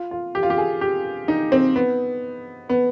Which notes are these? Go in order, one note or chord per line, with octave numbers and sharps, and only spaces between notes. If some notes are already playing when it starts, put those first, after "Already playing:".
Already playing: F4
F4
G4
F4
G4
G#4
G4
D#4
C4
B3
B3